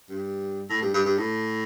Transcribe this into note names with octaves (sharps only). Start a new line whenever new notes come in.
G2
A2
G2
G2
G2
A2